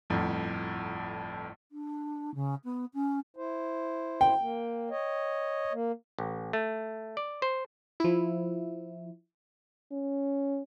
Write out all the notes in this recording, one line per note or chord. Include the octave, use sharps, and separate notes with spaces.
G1 F2 A2
D4
C#3
B3
C#4
E4 C5
G5
A#3
C#5 D#5
A#3
A1
A3
D5
C5
F3 E4
C#4